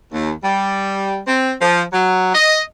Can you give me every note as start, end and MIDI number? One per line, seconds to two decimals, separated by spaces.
0.11 0.31 39
0.43 1.19 55
1.27 1.52 60
1.62 1.82 53
1.92 2.32 54
2.33 2.60 75